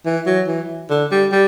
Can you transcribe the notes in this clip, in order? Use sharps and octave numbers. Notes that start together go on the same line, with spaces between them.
E3
F#3
E3
D3
G3
G3